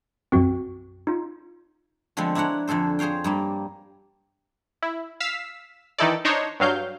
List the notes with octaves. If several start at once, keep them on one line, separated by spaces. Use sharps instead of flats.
B1 F#2 C4 F#4
D#4 F4
D3 F3 G#3 B3 C4
D4 E4 A#4 C#5 F#5
F2 D3 G#4 A4 C5
G#4 C5 C#5 F5 G5
G2 G3 A#3
E4
F5 E6 B6
D#3 E3 D#4 E4 A4 D5
D4 D#4 C5 C#5
G2 F#3 F5 G6